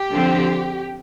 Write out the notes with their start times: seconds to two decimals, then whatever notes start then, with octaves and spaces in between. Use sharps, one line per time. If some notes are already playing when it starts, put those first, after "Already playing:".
Already playing: G4
0.13 D3 F3 C4